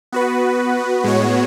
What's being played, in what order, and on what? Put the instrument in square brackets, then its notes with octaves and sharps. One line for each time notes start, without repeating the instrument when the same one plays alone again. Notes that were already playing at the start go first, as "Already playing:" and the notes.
[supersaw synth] B3 F#4 B4
A2 G#3 B3 F#4 C#5